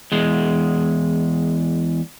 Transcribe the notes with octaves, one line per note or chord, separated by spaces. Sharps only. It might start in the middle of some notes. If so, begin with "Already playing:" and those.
E2 G#3